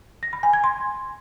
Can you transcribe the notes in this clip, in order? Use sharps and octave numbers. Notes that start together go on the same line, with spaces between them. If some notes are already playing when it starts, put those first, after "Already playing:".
A#6
B5
G#5
G#6
C6